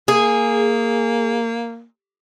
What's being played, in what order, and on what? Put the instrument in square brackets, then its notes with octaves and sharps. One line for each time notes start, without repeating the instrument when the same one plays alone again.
[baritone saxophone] A#3 [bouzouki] G#4